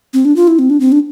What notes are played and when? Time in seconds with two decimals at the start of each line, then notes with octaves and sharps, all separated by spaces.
0.13 C4
0.25 D4
0.36 F4
0.47 E4
0.59 C4
0.70 D4
0.80 C4
0.92 D4